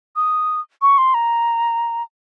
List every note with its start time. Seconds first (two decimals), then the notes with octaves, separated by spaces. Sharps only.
0.16 D#6
0.82 C#6
0.98 C6
1.14 A#5